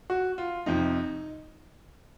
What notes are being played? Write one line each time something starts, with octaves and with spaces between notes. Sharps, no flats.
F#4
F4
F2 C3 F3 D#4